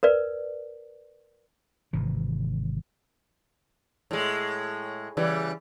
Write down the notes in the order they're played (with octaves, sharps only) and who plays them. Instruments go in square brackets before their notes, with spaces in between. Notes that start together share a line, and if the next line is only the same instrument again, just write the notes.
[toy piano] A#4 B4 D5
[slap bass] G#1 C3 E3
[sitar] A2 G#3
C#3 E3 G3